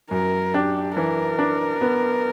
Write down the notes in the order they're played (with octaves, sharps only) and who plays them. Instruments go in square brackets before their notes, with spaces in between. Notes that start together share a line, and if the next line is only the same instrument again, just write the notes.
[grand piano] F#2 [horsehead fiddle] A#4
[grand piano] D4 [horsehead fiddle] G4
[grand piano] E3 [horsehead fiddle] A#4
[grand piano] D4
B3